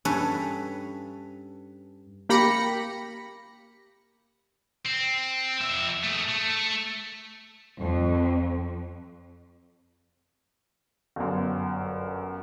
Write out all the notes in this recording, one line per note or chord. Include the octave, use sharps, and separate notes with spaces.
G2 C#4 A4 B4
A#3 G4 B5 A#6 C#7
C4
F2 E5
A3 G#4
A3
F2
G1 F#2